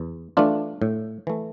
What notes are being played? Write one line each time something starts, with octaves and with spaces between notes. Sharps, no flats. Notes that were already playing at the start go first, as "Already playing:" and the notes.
Already playing: E2
E3 A3 D4 F4
A2
E3 A3